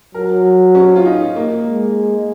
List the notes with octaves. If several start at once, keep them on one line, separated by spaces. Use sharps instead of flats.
F#3 A#4
C#4
F4
D#4
A#3
G#3